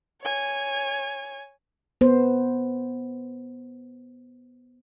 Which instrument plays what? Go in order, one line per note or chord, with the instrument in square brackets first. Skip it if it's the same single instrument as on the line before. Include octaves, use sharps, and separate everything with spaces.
[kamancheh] C#5 G#5
[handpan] B3 C5